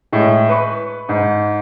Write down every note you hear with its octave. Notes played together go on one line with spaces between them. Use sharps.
A2 G#3
B4 C#6
G#2